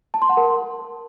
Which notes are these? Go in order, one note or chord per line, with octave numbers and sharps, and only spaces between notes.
A5
C6
F#5
A#4